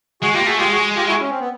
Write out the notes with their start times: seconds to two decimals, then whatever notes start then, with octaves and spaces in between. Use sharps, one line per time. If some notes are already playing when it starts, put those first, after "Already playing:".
0.22 G#3 F#4 G#4
0.34 A#3 F4 G4
0.46 A3 F#4 G#4
0.59 G#3 F4 G4
0.71 F#4 G#4
0.96 F4 G4
1.08 E4 F#4
1.20 C#4
1.30 C4
1.40 B3